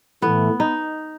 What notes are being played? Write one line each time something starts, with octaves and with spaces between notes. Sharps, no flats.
A2 E3 A3 B3
D#4